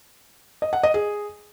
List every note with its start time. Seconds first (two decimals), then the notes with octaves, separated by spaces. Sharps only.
0.62 D#5
0.73 F#5
0.83 D#5
0.94 G#4